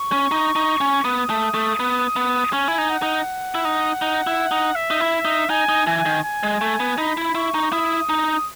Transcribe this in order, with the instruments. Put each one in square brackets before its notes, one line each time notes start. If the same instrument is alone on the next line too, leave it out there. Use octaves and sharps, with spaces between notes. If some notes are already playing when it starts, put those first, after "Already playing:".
Already playing: [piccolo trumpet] C#6
[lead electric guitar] C#4
D#4
D#4
C#4
[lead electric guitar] B3 [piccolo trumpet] D#6
[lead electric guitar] A3
A3
B3
B3
[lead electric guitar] C#4 [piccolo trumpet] G#5
[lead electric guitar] E4
D#4
[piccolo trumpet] F#5
[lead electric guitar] D#4
E4
D#4
D#4
E4
D#4
[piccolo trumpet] E5
[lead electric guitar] D#4
E4
D#4
[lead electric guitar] D#4 [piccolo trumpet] G#5
[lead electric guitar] D#4
[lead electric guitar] E3 [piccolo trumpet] G#5
[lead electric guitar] D#3
[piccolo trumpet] G#5
[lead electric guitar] G#3
A3
B3
[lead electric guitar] D#4 [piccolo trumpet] B5
[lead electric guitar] E4
[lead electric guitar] E4 [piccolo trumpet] C#6
[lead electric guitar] D#4
[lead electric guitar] E4 [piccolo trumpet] D#6
[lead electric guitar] D#4